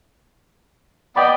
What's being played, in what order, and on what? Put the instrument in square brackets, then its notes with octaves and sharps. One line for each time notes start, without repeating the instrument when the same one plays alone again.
[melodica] B3 D5 [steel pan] D#5 G5 B5